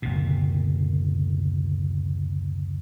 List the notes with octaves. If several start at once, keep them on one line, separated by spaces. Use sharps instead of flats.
F#1 D2 B2